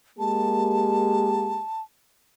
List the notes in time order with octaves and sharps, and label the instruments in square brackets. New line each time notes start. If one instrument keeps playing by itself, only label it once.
[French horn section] G#3 A#3 G4 [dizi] A5